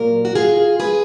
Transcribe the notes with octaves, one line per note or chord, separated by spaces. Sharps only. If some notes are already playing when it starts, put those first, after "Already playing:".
Already playing: A#2 F#3 A#3 A#4
F#4
F4 G#4
G#4 B4